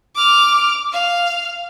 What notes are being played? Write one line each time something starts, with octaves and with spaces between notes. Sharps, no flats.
D6 F6
F5